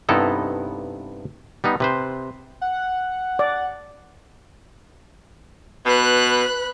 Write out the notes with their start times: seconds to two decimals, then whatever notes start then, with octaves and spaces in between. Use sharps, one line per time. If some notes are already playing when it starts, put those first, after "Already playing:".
0.09 G2 C3 B3 D#4 E4 A4
1.64 G3 B3 D#4
1.80 C3 B4 C5
2.61 F#5
3.39 D5
5.86 B2 B4 B5 F#6